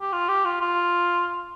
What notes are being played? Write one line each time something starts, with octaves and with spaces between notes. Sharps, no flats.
G4
F4
G4
F4
F4